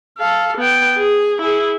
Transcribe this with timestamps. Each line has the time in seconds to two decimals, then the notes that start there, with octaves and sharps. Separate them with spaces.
0.18 A4 F5
0.57 B3 G5
0.98 G#4
1.41 E4 G#4